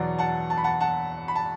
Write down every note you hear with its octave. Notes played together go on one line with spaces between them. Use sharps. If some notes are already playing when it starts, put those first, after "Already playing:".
Already playing: E2 B2 F#3 D5 F#5
F#5 A5
A5
B5
F#5 A5
F#5 A5
B5
A5